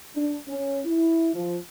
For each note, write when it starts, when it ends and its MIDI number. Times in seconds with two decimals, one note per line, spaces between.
0.16 0.36 62
0.48 0.80 61
0.85 1.31 64
1.34 1.57 53